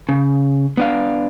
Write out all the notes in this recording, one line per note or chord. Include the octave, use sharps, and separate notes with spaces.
C#3
B3 D4 F5